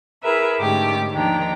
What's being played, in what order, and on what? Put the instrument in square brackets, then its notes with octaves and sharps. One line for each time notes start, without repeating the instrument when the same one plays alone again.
[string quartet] E4 G#4 A#4 B4 E5
G#2 D3 A3 C#4 G4 D6
D#2 D#3 F3 D4 G5 A#5